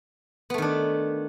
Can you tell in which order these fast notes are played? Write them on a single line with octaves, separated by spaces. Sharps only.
B3 A3 D#3 D4